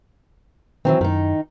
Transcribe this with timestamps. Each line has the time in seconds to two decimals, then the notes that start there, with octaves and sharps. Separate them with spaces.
0.85 D#3 E3 F#3 C4
1.01 F#2 D#3 D#4